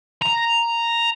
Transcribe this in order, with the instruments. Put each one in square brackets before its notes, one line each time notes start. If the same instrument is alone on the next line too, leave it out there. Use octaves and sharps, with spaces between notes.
[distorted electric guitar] A#5